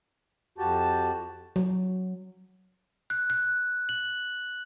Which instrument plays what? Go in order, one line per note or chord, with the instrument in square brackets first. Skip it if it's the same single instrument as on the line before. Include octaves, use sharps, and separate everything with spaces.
[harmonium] F2 F#4 G4 [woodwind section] A5
[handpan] F#3
[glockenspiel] F#6
F#6
F#7